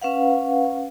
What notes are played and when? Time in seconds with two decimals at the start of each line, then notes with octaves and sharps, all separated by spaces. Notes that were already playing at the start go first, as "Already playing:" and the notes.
0.01 C#4 B4 F5 F#5